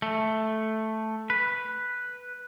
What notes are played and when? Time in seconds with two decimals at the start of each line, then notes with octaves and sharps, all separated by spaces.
0.02 A3
1.30 B4